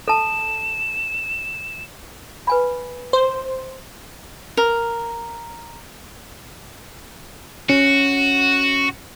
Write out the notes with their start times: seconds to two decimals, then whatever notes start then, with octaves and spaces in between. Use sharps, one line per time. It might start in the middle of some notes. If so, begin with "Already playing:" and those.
0.08 A4 A5 E7
2.47 B4 G#5 B5
3.13 C5
4.57 A#4
7.70 C#4 F#4